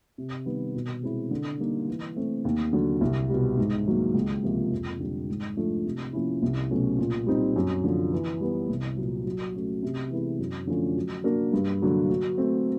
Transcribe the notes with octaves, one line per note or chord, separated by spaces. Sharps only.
C3
D#3 G3 B3
B2
G#3 C4 E4
D3
G3 A#3 D#4
E3
A3 C4
D#2
D3 F#3
C2
B2 G3
G#2
D#3 F#3 A#3
C#2
C3 F3 A#3
F2
D3 G3
G#2
F3 A3 D4 F4
C3
F3 A#3 C#4 E4
C2
B2 F#3 A3 C#4
A#2
G3 C4 D#4
F#2
D3 F3
E3
G3 B3
C2
A#2 F#3
F#3
A3 C#4 F#4
C3
E3 G#3 B3 E4
F#2
D3 F3 A3 C#4
F#3
A#3 D4 F#4 A#4
G2
D3 F#3 A#3
F#3
A3 C4